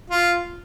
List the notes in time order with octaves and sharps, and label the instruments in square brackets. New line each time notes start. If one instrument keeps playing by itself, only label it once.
[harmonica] F4